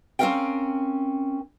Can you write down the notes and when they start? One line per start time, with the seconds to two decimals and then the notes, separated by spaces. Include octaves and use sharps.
0.19 C4 C#4 D#4 A#4 F5 G5